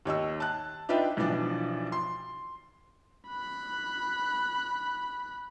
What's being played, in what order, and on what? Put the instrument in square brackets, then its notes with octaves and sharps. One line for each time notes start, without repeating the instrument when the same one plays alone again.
[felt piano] D#2 C#5 D#5 E6
A5 F#6
D4 D#4 F4 B4 E5 G5
B1 E3 F3 D4 D5
C6
[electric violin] B5 F#6